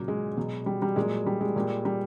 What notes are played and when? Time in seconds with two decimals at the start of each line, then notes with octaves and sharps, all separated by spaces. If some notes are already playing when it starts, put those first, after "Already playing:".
Already playing: A#2 C#3 F#3
0.08 G#3
0.37 B2 F#3
0.66 G3
0.82 G3
0.96 A#2 F#3 G#3
1.26 G3
1.41 G#3
1.56 A#2 G3
1.85 G3